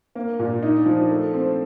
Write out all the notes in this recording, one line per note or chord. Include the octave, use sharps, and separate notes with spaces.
A#3
A#2
D#4
F3
A3
C4